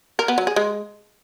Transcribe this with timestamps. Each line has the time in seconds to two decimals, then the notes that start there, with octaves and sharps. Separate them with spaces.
0.19 A#4
0.28 B3
0.38 F#3
0.47 G#4
0.56 G#3